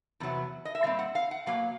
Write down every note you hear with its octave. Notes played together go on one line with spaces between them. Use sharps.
E2 C3 F#3 B3
D#5
E5
A#2 G3 C4 F5
F#5
F5
F#5
B2 F#3 A#3 F5